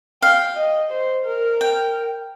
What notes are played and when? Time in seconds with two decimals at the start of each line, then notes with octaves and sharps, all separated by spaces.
0.22 F5 G5
0.57 D#5
0.91 C5
1.25 A#4
1.61 G5